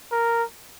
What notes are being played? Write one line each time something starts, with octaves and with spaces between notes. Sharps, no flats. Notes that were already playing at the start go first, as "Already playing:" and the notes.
A#4